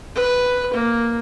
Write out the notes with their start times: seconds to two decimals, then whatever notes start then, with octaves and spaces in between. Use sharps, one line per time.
0.15 B4
0.74 A#3